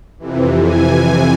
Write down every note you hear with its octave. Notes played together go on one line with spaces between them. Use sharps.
F2 C3 E3
G#5